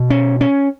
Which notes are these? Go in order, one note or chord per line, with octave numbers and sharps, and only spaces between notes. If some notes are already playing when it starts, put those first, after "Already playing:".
Already playing: B2
C#4
C#4